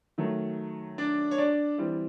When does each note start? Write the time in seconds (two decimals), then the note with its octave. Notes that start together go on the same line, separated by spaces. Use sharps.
0.18 D#3 F#3 A3
0.98 D4 D5
1.31 C#5
1.38 D4 D5
1.78 E3 G3 C4